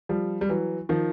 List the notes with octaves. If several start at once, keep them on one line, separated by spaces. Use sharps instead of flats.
F3 G3
G3
E3 F#3
D#3 F3